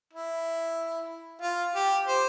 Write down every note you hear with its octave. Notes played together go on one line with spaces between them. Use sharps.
E4
F4
G4
C5